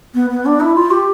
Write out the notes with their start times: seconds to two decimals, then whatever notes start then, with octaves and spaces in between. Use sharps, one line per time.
0.14 B3
0.30 B3
0.45 D4
0.60 E4
0.75 F4
0.91 G4